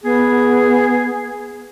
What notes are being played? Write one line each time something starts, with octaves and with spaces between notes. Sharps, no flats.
B3 G#4